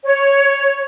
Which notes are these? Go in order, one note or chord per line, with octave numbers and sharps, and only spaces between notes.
C#5